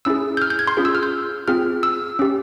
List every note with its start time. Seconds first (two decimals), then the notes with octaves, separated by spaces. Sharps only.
0.05 C#4 E4 G#4 E6
0.37 G6
0.42 F6
0.50 G6
0.59 G#6
0.67 C6
0.77 C#4 F4 G#4
0.85 E6
0.95 F6
1.03 G6
1.48 C4 F4 G#4 F6
1.83 E6
2.19 C#4 G4